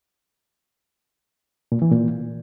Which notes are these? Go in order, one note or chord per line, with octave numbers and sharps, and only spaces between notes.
A#2
E3
A#2